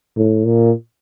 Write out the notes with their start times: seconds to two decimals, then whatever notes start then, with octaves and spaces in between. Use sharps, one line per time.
0.16 A2
0.45 A#2